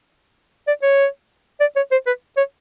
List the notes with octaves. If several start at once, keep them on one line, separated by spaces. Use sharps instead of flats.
D5
C#5
D5
C#5
C5
B4
C#5